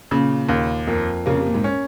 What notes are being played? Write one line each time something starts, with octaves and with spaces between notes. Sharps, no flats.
A#2 C#3
D#2
F2 A#3
C#3 A#3
C3
A#2
G#2
C#4